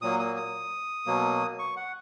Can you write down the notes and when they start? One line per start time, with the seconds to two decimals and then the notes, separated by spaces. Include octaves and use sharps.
0.02 A#2 F#3 A#3 D#6
0.19 D#6
0.37 D#6
1.06 B2 F#3 A#3
1.59 C#6
1.76 F#5